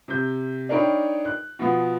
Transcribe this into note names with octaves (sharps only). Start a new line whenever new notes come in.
C3 G6
D4 D#4 A#4 C#5 G5 B5
F#6
B2 F3 B3